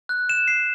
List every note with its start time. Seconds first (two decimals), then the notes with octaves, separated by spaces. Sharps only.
0.09 F#6
0.29 E7
0.48 C7